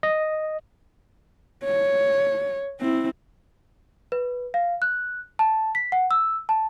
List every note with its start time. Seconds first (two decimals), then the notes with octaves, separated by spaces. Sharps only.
0.03 D#5
1.64 C#5
2.80 C4 E4
4.12 B4
4.54 F5
4.82 F#6
5.39 A5
5.75 B6
5.92 F#5
6.11 E6
6.49 A5